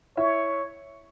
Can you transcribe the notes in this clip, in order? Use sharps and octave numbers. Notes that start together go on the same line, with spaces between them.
E4 C#5 E5